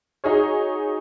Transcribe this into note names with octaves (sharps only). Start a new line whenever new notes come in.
D#4 F#4 G#4 C#5